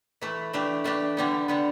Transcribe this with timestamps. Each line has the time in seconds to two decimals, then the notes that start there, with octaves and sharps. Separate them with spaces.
0.21 E3 A3 E4
0.53 E3 A3 D4 G4
0.84 E3 A3 D4 G4
1.17 D3 G3 B3
1.48 D3 G3 B3